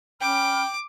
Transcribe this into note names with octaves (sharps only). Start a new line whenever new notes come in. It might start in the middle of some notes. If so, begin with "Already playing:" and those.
C#4 G5 B5 D6 F6